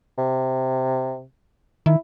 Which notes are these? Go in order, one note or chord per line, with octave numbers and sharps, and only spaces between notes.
C3
D#3 E4